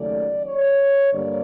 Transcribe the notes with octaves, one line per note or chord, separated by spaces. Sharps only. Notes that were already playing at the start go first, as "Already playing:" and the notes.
Already playing: D#2 C#3 F#3 A3 D5
C#5
G2 D3 G3 A#3 D5